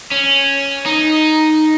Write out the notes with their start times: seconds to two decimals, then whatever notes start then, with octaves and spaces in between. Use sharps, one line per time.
0.11 C#4
0.86 D#4